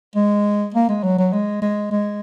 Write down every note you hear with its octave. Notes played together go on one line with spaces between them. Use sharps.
G#3
A#3
G#3
F#3
F#3
G#3
G#3
G#3